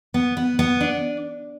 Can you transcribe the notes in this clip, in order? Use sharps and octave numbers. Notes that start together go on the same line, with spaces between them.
B3
B3
B3
D4